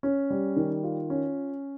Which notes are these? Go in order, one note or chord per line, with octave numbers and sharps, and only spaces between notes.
C#4
G3
D#3
F4
C#4